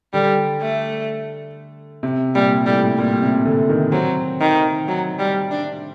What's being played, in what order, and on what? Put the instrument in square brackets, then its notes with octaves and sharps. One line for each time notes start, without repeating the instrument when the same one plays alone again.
[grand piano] D3 [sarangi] G3
[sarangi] A3
[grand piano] C3
[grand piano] A#2 [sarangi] G3
[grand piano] A2 [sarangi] G3
[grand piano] A#2 [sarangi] G3
[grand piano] C3
D3
D#3
[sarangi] F#3 [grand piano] C4
[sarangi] D#3
F#3
G3
D4